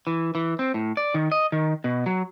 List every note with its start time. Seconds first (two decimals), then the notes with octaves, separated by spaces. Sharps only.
0.07 E3
0.35 E3
0.59 C4
0.74 A2
0.97 D5
1.14 D#3
1.32 D#5
1.52 D#3
1.84 B2
2.06 F#3